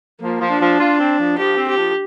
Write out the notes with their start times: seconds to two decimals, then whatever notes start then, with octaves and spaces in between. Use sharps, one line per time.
0.21 F3 A#3
0.41 F3
0.50 D4
0.61 F3
0.79 F4
1.00 C4
1.19 F3
1.38 F3 G4
1.57 C4
1.68 G4
1.77 F3